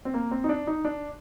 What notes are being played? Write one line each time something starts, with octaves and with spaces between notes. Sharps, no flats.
C4
A#3
C4
D#4
D4
D#4
D4